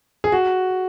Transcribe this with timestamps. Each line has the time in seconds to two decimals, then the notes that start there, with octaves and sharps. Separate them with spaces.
0.24 G#4
0.32 F#4